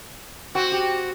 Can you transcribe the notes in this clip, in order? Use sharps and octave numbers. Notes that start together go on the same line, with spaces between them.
C4 F#4
G4